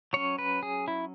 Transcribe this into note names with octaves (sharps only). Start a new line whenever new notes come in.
F#3 C#4 C#5
B4
G#4
E4